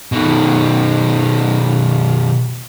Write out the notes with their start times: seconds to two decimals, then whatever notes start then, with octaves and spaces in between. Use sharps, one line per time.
0.12 B2 D#3